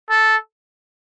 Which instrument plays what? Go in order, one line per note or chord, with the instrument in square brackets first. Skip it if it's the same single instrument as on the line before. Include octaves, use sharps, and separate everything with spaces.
[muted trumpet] A4